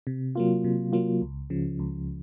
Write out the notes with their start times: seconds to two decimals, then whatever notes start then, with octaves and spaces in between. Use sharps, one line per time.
0.07 C3
0.35 F#3 A#3 F4
0.64 C3
0.93 F#3 A#3 F4
1.22 C#2
1.50 C#3 F3
1.79 C#2